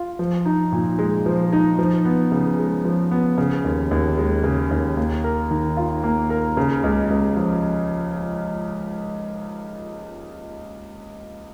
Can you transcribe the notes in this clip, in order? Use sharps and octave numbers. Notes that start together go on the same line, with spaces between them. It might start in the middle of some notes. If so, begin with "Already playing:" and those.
Already playing: F4
F3
D#4
A#2
G#3
F3
D#4
F3
B3
C#3
G#3
F3
B3
C#3
D#2
D#2
G#3
C#3
D#2
A#3
A#4
D#3
F4
A#3
A#4
C#3
C#2
C#2
F3